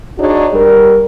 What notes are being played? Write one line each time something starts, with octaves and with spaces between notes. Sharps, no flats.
D4 D#4 F#4 G#4 C#5
G3 A#4